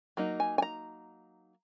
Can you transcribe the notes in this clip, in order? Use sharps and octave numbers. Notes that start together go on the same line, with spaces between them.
F#3 A#3 D#4
G#5
G#5
A#5